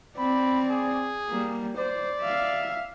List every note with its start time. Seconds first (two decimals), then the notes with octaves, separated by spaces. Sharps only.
0.18 C4 D5 B5
0.70 G#4
1.30 G3 A#3
1.77 C5 D5
2.22 E5 F5